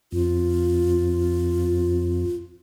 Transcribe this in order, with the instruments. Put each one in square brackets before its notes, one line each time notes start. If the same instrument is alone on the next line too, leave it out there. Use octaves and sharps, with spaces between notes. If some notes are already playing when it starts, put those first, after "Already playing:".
[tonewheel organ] F2 [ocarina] F4